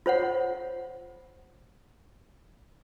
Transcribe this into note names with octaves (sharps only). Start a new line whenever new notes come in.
F4 C5 C#5 F#5